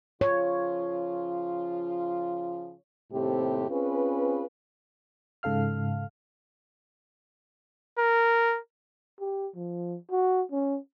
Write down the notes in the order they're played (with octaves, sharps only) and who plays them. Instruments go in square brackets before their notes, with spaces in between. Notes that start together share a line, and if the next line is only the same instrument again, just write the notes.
[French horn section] C#3 F3 F4 [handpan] C#5
[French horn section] D#2 A2 C3 A3 C4 G4
C4 C#4 F4 G#4 B4
[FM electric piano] G#2 C#3 A4 F5 F6
[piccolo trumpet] A#4
[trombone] G4
F3
F#4
C#4